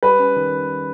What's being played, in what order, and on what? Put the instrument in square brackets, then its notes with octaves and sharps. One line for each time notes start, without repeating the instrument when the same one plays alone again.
[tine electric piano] G3 [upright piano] B4
[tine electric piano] C#4
D#3